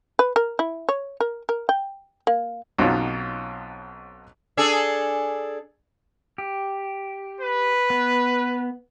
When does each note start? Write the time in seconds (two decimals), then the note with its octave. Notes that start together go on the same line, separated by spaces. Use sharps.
0.19 B4
0.36 A#4
0.59 E4
0.89 C#5
1.20 A#4
1.49 A#4
1.69 G5
2.27 A#3
2.78 B1 B2 C4 C#4 D#4 F4
4.57 D4 G#4 A4
6.38 G4
7.41 B4
7.90 B3